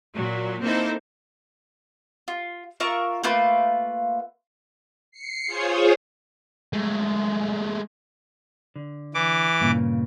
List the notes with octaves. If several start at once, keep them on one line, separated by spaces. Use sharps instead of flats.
A#2 F#3
A#3 C4 D#4 E4 A4 C5
F4
F4 A#4 E5 C#6
A3 A#3 F4 B4
C7 C#7
F4 G#4 C5 C#5
G#3 A3
D3
E3 D6
G2 A#2 C#3